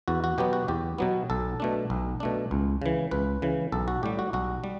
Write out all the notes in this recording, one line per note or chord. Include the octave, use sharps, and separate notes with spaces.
E2 F#4
F#4
B2 F#3 B3 G4
F#4
E2 G4
B2 F#3 B3
B1 A4
B2 A3 D4
B1
B2 A3 D4
C#2
C#3 E3
C#2 B4
C#3 E3
B1 A4
F#4
A2 G3 G4
F#4
B1 F#4
G3